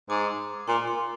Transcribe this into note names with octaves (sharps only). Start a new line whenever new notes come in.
G#2 D6
A#2 C6
C6